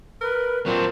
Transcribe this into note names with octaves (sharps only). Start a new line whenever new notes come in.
A#4 B4
A#2 F#3 C4 D4